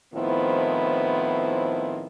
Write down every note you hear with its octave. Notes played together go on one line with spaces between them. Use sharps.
A2 D#3 F3 B3 C4 E4